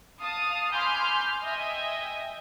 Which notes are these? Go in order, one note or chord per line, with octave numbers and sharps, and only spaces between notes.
F5 A5 D#6
G#5 B5 C6 D6 F6 G6
D#5 E5 G5 G#5